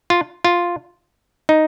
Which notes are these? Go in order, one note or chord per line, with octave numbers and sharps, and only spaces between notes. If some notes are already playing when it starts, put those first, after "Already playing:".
F4
F4
D#4